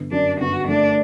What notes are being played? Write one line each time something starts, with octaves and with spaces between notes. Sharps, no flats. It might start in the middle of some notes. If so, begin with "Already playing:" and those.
Already playing: G1
F#2 D4
G1 F#4
A3 D4